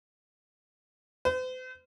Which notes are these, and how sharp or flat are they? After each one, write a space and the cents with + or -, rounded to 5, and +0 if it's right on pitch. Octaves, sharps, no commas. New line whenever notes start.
C5 -45